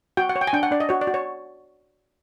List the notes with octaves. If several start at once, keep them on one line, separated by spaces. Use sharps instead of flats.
F#4 G5
F#5
C#5
G5
G#5
D4 G5
F#5
D4 D5
D#5
F#4 C#5
D5
F#4
C#5